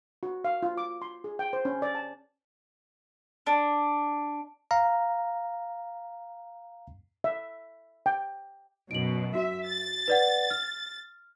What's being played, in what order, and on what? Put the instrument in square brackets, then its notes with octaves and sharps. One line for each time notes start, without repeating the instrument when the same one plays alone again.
[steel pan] F#4
F5
F4
D6
C6
G#4
G5
C5
C#4
D5
A5
[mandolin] D4
[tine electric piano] F5 A#5
[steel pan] E5
G5
[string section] F#2 B2 [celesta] D7 F#7
[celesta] F#4 [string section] E5
[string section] A6
[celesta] B4 D5 F#5
F6